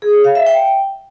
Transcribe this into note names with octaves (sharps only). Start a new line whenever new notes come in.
G#4
C#5
F5
E5
G5